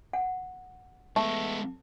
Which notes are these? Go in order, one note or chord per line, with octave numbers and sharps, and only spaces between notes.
F#5
G#3 A3 B3